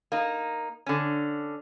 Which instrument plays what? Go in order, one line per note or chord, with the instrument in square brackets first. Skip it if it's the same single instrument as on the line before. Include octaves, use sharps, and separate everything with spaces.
[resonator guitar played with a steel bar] A#3 D#4
D3 C#4